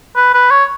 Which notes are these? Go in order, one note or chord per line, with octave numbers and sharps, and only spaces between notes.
B4
B4
C#5